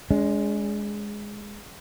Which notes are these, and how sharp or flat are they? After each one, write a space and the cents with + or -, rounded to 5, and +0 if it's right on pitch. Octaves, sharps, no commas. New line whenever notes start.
G#3 +0 D4 -40